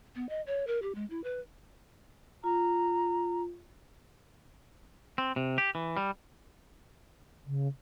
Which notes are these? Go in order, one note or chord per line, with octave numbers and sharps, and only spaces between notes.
B3
D#5
C#5
A#4
G4
G#3
E4
B4
F4 A#5
C4
C3
G4
E3
G3
C#3